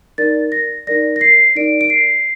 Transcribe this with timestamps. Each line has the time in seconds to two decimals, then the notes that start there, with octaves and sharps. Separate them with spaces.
0.18 D#4 A#4 D5 A6
0.52 A#6
0.87 D#4 A#4 D5 A#6
1.16 A#6
1.21 C7
1.55 D#4 A#4 D5 D7
1.81 D7
1.90 C7